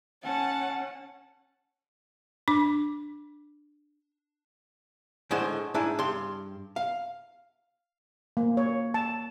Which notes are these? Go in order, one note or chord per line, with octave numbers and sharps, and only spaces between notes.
C#4 F#5 A5
D4 D6
A2 D3 G#3 C5 F#5
G#2 D4 E4 G#5
G2 C6
F5
A#3
C#5
A5